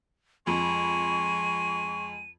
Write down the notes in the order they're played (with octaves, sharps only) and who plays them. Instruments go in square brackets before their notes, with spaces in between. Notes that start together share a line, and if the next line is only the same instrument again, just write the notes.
[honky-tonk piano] F2 [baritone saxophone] G#3 [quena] C#6 [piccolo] D#7